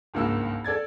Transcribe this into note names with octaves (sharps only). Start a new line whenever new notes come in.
G#1 C#2 G2 A#3 F#4 E6
A4 D5 G#6 A6